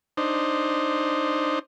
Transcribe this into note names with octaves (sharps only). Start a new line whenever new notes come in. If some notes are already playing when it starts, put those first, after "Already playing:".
D4 D#4 C5